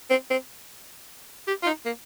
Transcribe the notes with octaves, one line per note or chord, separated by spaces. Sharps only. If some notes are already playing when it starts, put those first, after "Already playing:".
C4
C4
G4
F4
D#4
A#3